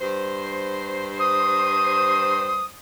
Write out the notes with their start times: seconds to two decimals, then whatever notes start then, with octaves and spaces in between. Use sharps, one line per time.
0.01 G2 C5
1.20 D#6